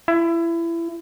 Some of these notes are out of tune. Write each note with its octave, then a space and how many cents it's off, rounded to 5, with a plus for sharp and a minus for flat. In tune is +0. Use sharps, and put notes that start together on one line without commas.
E4 +25